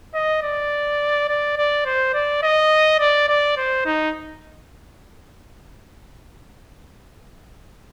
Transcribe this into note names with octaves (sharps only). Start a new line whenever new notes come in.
D#5
D5
D5
D5
C5
D5
D#5
D5
D5
C5
D#4